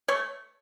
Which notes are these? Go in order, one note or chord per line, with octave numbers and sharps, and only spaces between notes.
A3 C#5